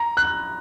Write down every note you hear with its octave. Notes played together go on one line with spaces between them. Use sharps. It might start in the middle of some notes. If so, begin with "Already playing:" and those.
Already playing: A#5
F#6